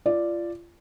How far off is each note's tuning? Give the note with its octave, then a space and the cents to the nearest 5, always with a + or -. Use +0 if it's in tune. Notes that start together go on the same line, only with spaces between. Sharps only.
F4 -30 D5 +0